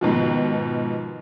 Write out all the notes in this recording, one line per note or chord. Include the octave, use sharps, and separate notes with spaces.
G#2 B2 D#3 F3